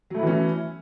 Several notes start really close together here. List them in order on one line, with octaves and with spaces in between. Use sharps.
F#3 A3 E4 E3 C#4